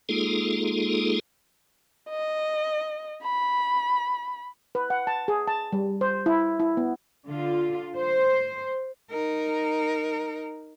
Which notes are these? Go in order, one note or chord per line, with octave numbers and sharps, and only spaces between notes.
G#3 A#3 D#4 F4 G#4 A4
D#5
B5
B4
F#5
A5
G#4
A5
G3
C5
E4
E4
B3
D3 F4
C5
D#4 A#4